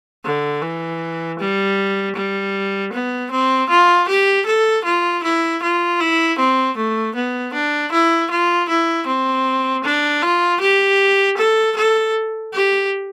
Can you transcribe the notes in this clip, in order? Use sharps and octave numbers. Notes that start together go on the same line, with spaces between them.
D3
E3
G3
G3
B3
C4
F4
G4
A4
F4
E4
F4
E4
C4
A3
B3
D4
E4
F4
E4
C4
D4
F4
G4
A4
A4
G4